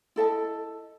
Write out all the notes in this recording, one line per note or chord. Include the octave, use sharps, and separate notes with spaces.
E4 A4 D#5 A5